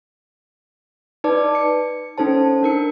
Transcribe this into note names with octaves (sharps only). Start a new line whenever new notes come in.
D#4 B4 D5 A5 D6
C#7
C#4 D#4 A4 C5 A5
D4 A#4 C#7